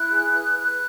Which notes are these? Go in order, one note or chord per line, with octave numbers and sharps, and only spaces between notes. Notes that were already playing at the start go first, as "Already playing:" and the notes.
Already playing: E4 F#6
G#4
B4
B4 F#6